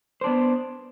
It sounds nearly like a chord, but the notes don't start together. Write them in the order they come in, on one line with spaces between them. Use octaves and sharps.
C5 D4 B3